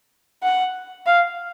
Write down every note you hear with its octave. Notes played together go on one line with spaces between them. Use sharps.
F#5
F5